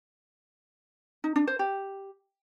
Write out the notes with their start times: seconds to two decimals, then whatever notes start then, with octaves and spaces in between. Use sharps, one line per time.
1.24 D#4
1.36 D4
1.47 C5
1.59 G4